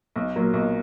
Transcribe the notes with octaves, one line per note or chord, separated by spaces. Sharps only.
B1
A#2 F#3 A#3
B1